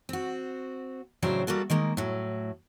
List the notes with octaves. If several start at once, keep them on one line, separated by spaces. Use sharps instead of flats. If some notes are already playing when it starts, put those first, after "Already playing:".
C4 F#4
A2 C#3 F#3 D4 C5 G5
G3 A#3 F#4 A4
D#3 G#3 A#3
A2 F#3